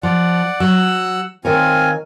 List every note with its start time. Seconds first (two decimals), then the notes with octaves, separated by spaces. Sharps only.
0.03 F3 D5 F#5
0.60 F#3 F#5 E6 F#6
1.45 D#3 C4 F4 A#4 C#5 G#5